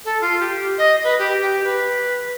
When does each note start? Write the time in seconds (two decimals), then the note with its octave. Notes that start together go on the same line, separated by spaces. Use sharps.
0.05 A4
0.21 F4
0.40 G4
0.78 D#5
1.04 B4
1.19 G4
1.42 G4
1.64 B4